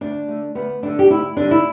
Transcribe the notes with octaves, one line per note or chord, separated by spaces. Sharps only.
D2 D4
D3 A3
D2 B3
D3 A3 D4
G4
D2 E4
D3 G3 D4
E4